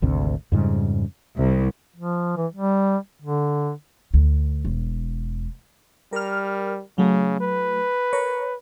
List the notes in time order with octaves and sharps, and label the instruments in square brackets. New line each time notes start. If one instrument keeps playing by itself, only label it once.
[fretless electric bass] G#1 D2 C3
F2 G#2 C#3 G3
[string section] C2
[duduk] F3
E3
G3
D3
[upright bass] D2
E1
[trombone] G3 [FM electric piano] A#4 F6
[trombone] C#3 [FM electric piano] F#3 A3
[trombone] B4
[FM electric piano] A#4 C#5